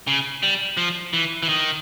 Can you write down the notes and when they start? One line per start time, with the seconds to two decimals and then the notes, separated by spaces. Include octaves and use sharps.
0.07 C#3
0.43 G3
0.77 F3
1.13 E3
1.43 E3
1.49 D#3